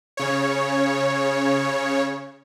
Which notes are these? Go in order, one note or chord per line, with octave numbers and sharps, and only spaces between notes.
C#3 C#5